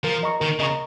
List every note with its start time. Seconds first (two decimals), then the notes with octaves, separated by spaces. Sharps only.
0.04 F3 A#4
0.23 D#5 A#5 C#6
0.40 D#3 A#4
0.59 C#3 D#5 A#5 C#6